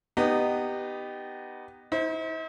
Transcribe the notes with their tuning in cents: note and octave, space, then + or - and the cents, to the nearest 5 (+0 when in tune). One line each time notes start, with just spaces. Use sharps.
B3 +5 D#4 -20 G4 +0
E4 -45 C5 +0